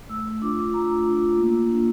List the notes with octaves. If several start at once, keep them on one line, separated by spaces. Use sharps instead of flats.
A3 E6
D4 F4 D6
A3 A#5
D4 F4
A#3
D4 F4